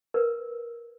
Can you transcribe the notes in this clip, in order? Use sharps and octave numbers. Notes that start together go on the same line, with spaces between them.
A#4 B4